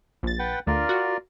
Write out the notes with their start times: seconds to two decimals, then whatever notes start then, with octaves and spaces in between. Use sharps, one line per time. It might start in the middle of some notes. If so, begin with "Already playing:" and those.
0.23 A#1 A6
0.39 B4 F#5 G5
0.67 D2 F4 A#4 D5
0.89 F#4